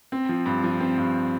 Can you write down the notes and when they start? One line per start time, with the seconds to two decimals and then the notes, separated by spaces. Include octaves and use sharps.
0.12 C4
0.29 F3
0.46 G2
0.64 F3
0.80 C4
0.98 G2